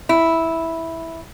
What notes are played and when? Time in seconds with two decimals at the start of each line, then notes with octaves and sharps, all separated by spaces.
0.09 E4